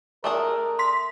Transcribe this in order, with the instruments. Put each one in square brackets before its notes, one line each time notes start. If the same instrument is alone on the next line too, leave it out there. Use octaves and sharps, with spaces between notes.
[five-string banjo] A3 D4 G#4 [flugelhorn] A#4
[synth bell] C6 B6